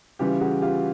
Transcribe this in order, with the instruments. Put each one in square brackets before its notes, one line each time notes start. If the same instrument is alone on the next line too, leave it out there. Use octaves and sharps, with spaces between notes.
[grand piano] C#3 E3 G3 [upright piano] F4 G4
[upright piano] F#4 G#4
F4 G4